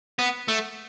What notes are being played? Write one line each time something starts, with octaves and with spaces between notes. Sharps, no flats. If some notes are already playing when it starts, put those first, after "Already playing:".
B3
A3